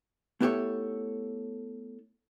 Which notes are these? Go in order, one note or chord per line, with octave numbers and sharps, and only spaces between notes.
A3 B3 E4 G4 A4 C#5